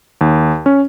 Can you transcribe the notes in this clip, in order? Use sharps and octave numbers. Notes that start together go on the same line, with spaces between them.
D#2
C#4